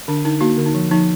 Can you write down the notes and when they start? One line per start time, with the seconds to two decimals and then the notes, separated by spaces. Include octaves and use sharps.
0.08 D3 D4
0.25 D3 D#4
0.41 A#3 D#4 F#4
0.58 D3
0.66 D#4
0.74 F3
0.91 F3 D#4